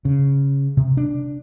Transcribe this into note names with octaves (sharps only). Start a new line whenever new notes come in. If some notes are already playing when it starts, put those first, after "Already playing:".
C#3
C3
D4